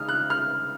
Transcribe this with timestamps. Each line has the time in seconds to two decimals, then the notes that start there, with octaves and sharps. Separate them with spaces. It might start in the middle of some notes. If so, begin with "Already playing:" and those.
Already playing: C#3 G#3 D#4 D#6 F6
0.09 F#6
0.30 F6